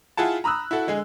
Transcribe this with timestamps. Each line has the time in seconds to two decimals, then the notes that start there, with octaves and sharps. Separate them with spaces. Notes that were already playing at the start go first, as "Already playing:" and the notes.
0.17 E4 F4 G#4 F#5 A5
0.44 A#5 B5 D#6 E6 F#6
0.71 E4 F#4 A4
0.87 D3 G#3 G#4